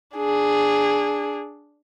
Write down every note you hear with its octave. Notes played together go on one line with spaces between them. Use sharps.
D4 G#4